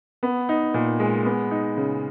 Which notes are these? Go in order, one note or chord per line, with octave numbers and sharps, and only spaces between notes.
B3
D#4
A#2
G#3
B3
D#4
C#3